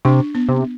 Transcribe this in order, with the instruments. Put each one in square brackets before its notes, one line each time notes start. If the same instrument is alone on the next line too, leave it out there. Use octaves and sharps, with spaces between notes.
[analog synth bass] C3 [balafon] D4
[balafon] B3
[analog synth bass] C3